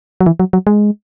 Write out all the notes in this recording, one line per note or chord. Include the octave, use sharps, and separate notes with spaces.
F#3
E3
F#3
F#3
G#3